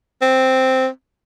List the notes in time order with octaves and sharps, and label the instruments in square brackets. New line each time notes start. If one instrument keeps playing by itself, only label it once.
[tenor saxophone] C4